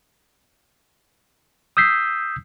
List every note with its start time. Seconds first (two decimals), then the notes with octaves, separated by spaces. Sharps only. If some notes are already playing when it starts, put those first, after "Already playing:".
1.77 D#6 E6 G6 B6 C7